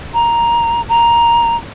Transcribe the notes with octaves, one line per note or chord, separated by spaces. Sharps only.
A#5
A#5